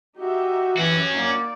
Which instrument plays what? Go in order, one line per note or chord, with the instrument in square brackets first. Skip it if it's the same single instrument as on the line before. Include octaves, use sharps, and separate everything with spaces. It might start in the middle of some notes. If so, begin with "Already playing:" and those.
[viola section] D#4 G4 E5 [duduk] F#4
[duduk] E3 [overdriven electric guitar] C#4 F#4
[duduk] A#3 [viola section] D#4 D5